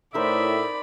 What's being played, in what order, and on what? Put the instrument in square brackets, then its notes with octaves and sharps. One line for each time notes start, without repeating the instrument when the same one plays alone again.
[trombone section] A2 [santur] D#4 A#4 C5 [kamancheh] D5 B5 [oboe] E5